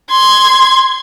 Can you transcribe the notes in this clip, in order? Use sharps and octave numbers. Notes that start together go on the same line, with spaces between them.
C6 G#6